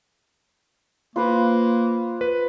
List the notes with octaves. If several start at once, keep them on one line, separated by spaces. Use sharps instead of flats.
A#3 F4 B4 C5
B4